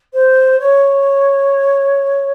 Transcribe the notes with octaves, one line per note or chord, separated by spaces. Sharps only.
C5
C#5